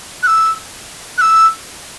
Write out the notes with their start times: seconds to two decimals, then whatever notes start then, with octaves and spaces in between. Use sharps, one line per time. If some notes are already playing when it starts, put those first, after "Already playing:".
0.23 F#6
0.27 E6
1.18 F#6
1.21 E6